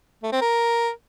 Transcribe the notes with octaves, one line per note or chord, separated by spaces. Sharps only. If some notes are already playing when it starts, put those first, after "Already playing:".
A3
C4
A#4